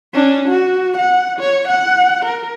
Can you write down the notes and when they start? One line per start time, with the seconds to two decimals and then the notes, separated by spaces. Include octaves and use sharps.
0.14 C#4 D4
0.48 F#4
0.97 F#5
1.39 C#5
1.68 F#5
2.25 A#4